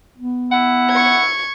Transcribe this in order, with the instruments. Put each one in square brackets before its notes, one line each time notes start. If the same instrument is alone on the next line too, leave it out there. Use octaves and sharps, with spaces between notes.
[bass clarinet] B3
[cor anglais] E4 [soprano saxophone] F#5
[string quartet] C#6 G#6